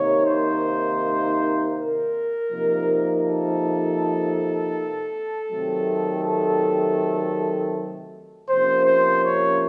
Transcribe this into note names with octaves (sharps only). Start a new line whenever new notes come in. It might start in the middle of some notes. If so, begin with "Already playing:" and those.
Already playing: C3 D#3 A#3 D#4 C#5
C5
A#4
C3 F3 A#3 D#4
A4
C3 D#3 F#3 A3 C4
A4
C3 F3 A#3 C#4 C5
C5
C#5